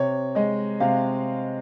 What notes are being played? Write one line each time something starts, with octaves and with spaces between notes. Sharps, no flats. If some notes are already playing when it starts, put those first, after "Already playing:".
Already playing: C3 C#5
G#3 D#5
C3 F5